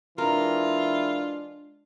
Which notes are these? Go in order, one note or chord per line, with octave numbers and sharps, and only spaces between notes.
E3 G#3 D4 F4 A#4